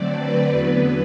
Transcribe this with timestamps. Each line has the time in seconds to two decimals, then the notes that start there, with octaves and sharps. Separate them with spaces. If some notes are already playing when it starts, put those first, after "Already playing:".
Already playing: D3 F#3 A3 C4 D5
0.17 B4
0.50 E2 D3 F#3 B3 B4